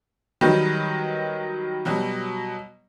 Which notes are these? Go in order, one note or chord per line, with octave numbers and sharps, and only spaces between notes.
D#3 F#3 G3 G4 B4
B2 F#3 G3